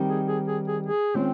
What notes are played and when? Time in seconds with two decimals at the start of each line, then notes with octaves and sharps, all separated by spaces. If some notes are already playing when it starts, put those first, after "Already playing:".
Already playing: D#3 G3 C4 D#4
0.09 G#4
0.28 G#4
0.48 G#4
0.67 G#4
0.86 G#4
1.14 D#3 G#3 C4 C#4 F4